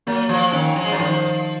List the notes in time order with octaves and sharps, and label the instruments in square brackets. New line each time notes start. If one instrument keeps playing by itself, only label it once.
[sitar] F#3 [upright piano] A#3
[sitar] F3
[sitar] D#3 [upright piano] C#4
[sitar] F3
G#3
F#3
[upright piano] D#3 [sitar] F3